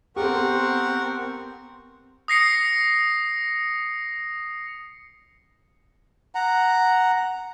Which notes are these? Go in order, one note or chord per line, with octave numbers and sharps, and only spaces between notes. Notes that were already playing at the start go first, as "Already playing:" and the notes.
B3 C4 G4 A4 A#4 F#5 C#6
D#6 A#6 C7 C#7
F#5 A#5